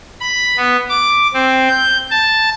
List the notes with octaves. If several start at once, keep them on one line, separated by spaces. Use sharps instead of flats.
B5
B3
D6
C4
G6
A5